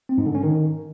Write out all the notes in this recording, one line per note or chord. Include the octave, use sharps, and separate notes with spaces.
C4
G#2
D3
C#4
D#3